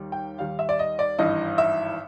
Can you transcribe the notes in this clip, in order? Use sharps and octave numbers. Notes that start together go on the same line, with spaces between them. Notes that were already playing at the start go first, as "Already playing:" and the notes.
Already playing: D#2 D#3 G3
G5
D#2 D#3 G3 F5
E5
D5
D#5
D5
G#1 G2 E3 D#5
E5